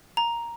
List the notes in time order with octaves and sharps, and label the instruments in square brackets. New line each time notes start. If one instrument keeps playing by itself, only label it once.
[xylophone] A#5